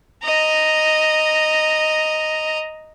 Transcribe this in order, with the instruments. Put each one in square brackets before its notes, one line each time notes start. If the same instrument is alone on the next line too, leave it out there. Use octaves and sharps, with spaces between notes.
[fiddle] D#5 A#5